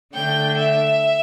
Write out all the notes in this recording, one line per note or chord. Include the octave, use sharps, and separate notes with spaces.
D3 A3 D4 G5
E5